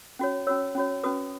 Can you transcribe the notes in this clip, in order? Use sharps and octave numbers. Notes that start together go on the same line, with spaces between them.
C#4 F#4 C#5
C#4 F#4 C#5 E6
C#4 F#4 C#5
C#4 F#4 B4 D#6